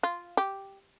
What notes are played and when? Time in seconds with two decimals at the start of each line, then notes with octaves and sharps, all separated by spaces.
0.03 F4
0.37 G4